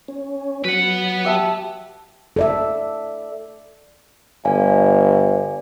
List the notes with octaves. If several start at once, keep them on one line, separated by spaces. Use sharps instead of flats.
C#4
F#3 B4 F#5
G4 E5 A5
A4 D5 E5
G1 D5 F5 G#5